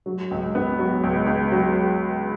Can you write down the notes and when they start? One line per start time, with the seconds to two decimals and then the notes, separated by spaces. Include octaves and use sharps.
0.06 F#3
0.31 C#2
0.55 B3
0.79 F#3
1.04 C#2
1.27 C#2
1.52 F#3